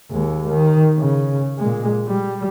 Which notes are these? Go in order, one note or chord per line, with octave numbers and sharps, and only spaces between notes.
D#2 G#3
D#3
C#3
A#2 G#3
G3